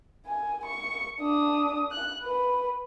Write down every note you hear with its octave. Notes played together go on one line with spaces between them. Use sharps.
G#5
C#6
D4 D#6
F#6
B4